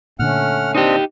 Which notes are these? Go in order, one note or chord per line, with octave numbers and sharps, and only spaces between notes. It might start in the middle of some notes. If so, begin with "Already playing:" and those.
A#2 D3 A3 C#4 F#5 F6
C4 D4 D#4 G4 D#5